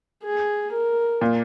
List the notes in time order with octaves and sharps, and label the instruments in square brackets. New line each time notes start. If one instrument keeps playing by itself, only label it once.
[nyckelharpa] G#4
A#4
[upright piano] A#2